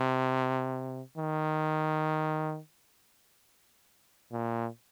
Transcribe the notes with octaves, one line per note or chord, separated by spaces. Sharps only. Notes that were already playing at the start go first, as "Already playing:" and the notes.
Already playing: C3
D#3
A#2